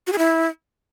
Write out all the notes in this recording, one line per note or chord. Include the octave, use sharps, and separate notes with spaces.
F#4
G#4
E4